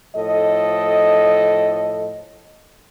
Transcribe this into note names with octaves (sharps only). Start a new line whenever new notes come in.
A2 F3 A4 D#5